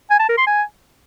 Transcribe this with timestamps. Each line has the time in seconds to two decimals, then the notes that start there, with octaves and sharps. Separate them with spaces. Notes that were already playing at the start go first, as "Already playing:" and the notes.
0.11 G#5
0.20 A5
0.29 A#4
0.38 C6
0.47 G#5